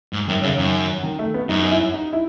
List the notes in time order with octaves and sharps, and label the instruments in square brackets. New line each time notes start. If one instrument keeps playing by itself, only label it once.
[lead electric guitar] G#2
[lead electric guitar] F#2 [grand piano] D#3
[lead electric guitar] F#2 [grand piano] C#3
[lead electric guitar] F#2 [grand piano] D#3
[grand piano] D#3
A3
B3
[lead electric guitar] F#2 [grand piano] D#4
[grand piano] E4
D#4
E4